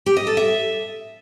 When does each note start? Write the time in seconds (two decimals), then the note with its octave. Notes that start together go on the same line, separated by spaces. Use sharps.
0.06 G4
0.17 D#5
0.27 A4
0.37 E5